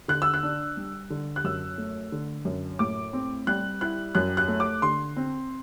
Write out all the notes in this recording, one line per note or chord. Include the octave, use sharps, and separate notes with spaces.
D3 F#6
E6
F#6
D4
G3
D3
F#6
F#2 E6
A3
D3
F#2
A2 D6
C4
G3 F#6
E4 F#6
F#2 F#6
F#6
A3
D6
D3 C6
C4